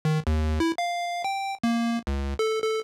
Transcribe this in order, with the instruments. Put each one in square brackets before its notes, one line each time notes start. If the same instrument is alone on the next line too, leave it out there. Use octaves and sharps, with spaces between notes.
[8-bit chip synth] D#3
D#2
E4
F5
G5
A#3
C#2
A4
A4